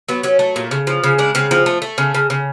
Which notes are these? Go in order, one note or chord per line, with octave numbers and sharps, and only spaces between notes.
F#3 B3
F#3 C#4
A3
A#2
C#3
F3
C#3
G#3 D4
C#3 C4
F3 C4
A3
A3
C#3
C#3
C#3